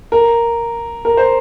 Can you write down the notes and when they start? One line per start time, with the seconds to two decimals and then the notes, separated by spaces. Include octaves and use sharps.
0.12 A#4
1.05 A#4
1.17 C5